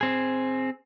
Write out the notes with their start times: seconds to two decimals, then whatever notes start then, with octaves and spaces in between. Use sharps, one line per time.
0.01 C4 G#4